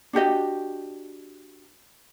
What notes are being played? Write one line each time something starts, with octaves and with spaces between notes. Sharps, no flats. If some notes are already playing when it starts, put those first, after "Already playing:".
D4 F#4 G4 D#5